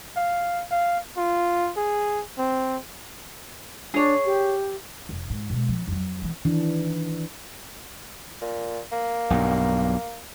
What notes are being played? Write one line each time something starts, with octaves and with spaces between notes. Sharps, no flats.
F5
F5
F4
G#4
C4
D4 G#4 C#5
G4
F1
G#2
B2 G#3
F3
F2 F#3
E3 B3
D#3 E3 D4
A#2
A#3
B1 G2